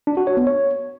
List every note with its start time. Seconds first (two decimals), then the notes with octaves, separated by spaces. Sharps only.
0.07 D4
0.17 F#4
0.27 C#5
0.37 B3
0.47 C#5